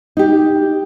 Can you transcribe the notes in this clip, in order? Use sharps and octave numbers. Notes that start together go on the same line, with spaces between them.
D#4 G4